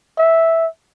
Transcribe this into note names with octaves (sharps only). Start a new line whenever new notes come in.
E5